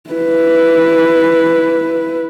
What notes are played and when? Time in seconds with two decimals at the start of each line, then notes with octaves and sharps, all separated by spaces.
0.10 E4 B4